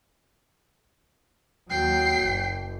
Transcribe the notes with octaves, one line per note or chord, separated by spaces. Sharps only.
D#2 F#3 G5 C7
F#1